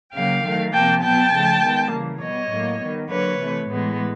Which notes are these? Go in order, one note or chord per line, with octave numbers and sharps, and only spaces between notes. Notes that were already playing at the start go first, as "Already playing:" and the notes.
C#3 F#3 A#3 F5 G5
D#3 F#3 A3
C3 F3 A#3 G5 A5
B2 F#3 B3 G5 A5
C#3 F3 A3
D#3 G#3 B3
C#3 E3 G3 A#3
B2 G3 B3 C#5 D#5
A2 F#3 A#3
D#3 G3 B3
D3 F#3 A#3 B4 C#5
C3 E3 A3
A2 E3 G#3 B3